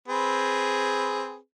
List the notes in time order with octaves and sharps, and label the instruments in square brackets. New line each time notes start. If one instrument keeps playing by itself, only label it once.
[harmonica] C4 G#4 B4